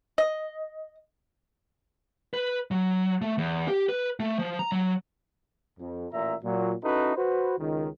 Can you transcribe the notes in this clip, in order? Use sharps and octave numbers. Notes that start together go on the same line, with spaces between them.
D#5
B4
F#3
A3
E2
G4
B4
A3
F3
A#5
F#3
F2
A1 A#2 E5 A#5
A#2 F#3
C#4 D#4 E4 F#4 A4 B4
F#4 B4 C5
C#2 D#3